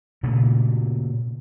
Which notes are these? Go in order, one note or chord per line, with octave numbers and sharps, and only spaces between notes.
A#2 C#3 A3 A#3